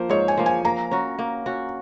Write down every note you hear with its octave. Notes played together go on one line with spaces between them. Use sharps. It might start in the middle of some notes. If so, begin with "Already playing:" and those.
Already playing: F3 A#3 C5
G#2 C#5
G#5
F3 A#3
G#5
A#3 A#5
C#4 F#4
A#3
C#4 F#4